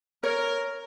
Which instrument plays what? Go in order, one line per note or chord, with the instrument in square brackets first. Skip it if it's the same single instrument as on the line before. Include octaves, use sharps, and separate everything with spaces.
[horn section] A#4 [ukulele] C#5